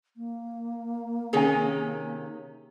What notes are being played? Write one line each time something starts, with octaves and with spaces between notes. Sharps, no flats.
A#3
C3 D#3 C#4 G#4 C#5 G#5